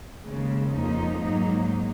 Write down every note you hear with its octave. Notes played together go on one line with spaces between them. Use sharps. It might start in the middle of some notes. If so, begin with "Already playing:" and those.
D#2 C#3 G#3
F2 F3 A#3 D#4
G#2 F#3 A#3 D#4